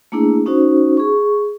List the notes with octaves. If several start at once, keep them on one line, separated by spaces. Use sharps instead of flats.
A3 A#3 D4 E4 G#4
C#4 D#4 F#4 C5
G#4 C#6